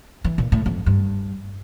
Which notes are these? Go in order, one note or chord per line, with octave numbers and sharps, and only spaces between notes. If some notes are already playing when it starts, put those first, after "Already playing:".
E3
A#2
A2
F2
G2